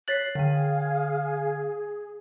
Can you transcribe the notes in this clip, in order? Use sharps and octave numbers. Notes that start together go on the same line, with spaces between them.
C#5 F#6 A6 B6 C7 F#7
D3 G#4 F5 G5